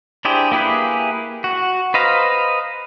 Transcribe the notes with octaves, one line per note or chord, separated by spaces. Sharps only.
D4 E4 G4 G#4 C5
A#3 E4 G4 G#4 B4
F#4
B4 C5 D#5 F5 A#5